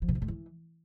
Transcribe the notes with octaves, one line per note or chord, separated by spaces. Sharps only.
F3
B2
G#2
A2
E3